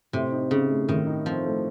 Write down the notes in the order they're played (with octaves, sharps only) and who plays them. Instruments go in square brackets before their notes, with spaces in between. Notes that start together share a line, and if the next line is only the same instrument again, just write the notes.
[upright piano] A2 [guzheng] C3
[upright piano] D#4
[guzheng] C#3 [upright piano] C4
[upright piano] A3
[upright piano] A2 [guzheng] D#3
[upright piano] D#4
[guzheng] F3 [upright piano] C4
[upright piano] A3